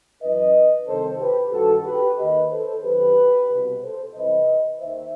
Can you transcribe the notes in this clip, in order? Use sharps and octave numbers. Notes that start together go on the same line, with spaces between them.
F#2 E3 B4 D#5
C2 C3 D#3 A4 C5
G4 B4
G2 D#3 F#4 A4
G4 B4
D#2 D#3 B4 D#5
A4 C5
F#2 D#3 G4 B4
C2 B2
A4 C5
C2 C3 E3 B4 D#5
D#2 D#3 C5 E5